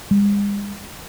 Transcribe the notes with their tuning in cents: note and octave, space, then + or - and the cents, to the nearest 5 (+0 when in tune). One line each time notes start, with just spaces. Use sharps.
G#3 -45